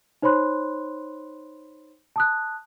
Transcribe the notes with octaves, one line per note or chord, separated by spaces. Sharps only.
D#4 C5 C#5 B5 C6 F#6
A5 D#6 F#6